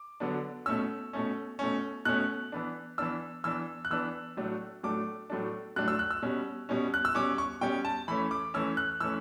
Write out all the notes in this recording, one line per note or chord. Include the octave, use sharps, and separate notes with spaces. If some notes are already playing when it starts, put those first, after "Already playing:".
Already playing: D6
D3 F#3 B3 D4
B2 A3 C#4 E6
B2 A3 C#4
B2 A3 C#4
B2 A3 C#4 F#6
E3 B3 D4
E3 B3 D4 E6
E3 B3 D4 E6
F#6
E3 B3 D4 E6
A2 F#3 A3 D4
A2 F#3 A3 D4 D6
A2 F#3 A3 D4
A2 F#3 A3 D4 F#6
E6
F#6
E6
B2 G3 C#4
B2 G3 C#4
F#6
E6
B2 G3 C#4 D6
C#6
B2 G3 C#4 G5
A5
E3 A3 C#4 B5
D6
E3 A3 C#4 E6
F#6
E3 A3 C#4 E6